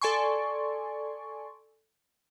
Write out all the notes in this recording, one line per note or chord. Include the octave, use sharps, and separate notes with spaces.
A4 D5 G#5 C6 C#6